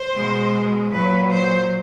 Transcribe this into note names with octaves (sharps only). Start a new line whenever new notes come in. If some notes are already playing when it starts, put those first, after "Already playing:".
Already playing: C5
B2 G#3
A#2 F#3 B4
C5